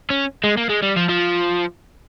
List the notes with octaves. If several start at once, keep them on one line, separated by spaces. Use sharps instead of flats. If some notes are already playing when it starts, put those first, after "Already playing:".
C#4
G#3
A#3
G#3
G3
F3
F3